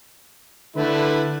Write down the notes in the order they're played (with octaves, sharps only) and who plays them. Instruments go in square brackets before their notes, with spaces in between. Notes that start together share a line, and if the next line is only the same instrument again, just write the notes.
[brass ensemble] D3 B4 [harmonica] A3 E4